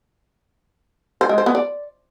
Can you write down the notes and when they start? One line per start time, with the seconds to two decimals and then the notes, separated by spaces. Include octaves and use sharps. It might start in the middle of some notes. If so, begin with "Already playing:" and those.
1.21 C5
1.29 G#3
1.38 C5
1.46 B3
1.55 D5